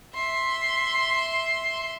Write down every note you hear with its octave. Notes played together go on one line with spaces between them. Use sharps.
E5 C6